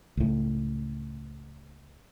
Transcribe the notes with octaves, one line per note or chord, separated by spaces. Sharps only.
C#2 A2